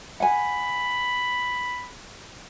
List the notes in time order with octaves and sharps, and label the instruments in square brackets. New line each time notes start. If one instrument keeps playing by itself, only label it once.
[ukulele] F#5 G#5 [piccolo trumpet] B5